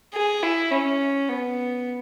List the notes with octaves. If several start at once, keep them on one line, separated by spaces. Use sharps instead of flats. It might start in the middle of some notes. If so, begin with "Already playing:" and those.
G#4
E4
C#4
B3